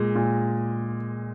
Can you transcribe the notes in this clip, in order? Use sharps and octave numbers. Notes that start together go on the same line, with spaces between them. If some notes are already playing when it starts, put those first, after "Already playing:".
Already playing: A#2 G#3
A#2